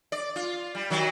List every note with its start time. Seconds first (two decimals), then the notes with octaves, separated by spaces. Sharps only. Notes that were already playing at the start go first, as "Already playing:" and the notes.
0.12 D5
0.36 F4
0.75 G3
0.90 D#3 F#3 F#4